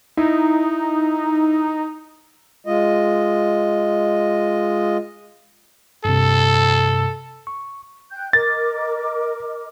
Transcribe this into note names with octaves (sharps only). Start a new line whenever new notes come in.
D#4 E4
G#3 F4 D#5
G2 C3 A4
C#6
G5 F#6 G6
A#4 D#5 D6 A6